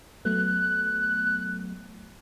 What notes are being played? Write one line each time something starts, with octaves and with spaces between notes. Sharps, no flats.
F#3 A3 B3 F#6